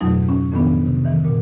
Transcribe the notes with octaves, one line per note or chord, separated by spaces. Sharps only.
F2 G#2 B2 F#3 A3 D#4
C#4
F2 A2 D#3 F3 B3 D4
C3
D#3 E3
A#2